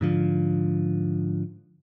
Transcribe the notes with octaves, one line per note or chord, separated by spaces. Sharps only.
G#2 D3 F3